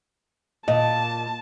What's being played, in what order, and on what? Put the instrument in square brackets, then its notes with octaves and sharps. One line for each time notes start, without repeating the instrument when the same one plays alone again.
[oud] A#2 [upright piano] D#5 [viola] A5